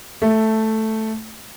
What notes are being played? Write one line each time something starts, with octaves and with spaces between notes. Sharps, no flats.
A3